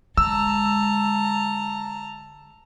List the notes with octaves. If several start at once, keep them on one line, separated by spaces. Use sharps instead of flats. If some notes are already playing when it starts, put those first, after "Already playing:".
D3 G#3 A5 A#5 E6